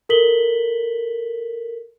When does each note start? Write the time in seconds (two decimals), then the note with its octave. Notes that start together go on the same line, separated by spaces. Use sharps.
0.09 A4 A#4 B6 F#7 G7